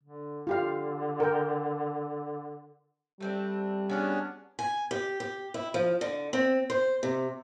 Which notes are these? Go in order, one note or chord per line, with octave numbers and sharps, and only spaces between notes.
D3
D3 F4 G4 F5
A#4 G5
G3 A3 C4 D4
B3 C#4 D4 F#4 G#4
G#5
G4
G4
E4
F3
D3
C4
C5
C3